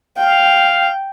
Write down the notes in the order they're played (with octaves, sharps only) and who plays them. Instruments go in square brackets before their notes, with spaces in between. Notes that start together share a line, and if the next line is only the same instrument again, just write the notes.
[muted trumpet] F5 [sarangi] G5